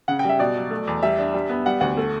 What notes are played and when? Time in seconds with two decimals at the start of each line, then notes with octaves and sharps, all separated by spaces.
0.08 C#3 F#5
0.19 G5
0.25 G3 E5
0.39 B2 D5
0.56 F#3
0.71 A3
0.87 E2
1.03 G3 E5
1.18 D4
1.34 G3
1.50 B3
1.66 G3 F#5
1.81 D2 F#5
1.97 A3